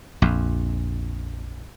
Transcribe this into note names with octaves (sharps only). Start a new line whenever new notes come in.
A#1 F2